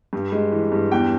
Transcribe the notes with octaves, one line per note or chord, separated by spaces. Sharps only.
G2
G#3
E3
G2
E2 G5